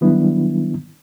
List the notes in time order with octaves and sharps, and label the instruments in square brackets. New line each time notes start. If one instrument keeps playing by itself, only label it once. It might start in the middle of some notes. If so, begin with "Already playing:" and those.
[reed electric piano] D#3 F#3 G3 B3 D4 E4